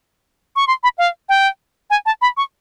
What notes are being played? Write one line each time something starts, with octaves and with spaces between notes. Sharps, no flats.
C#6
C6
B5
F5
G5
G#5
A5
B5
C#6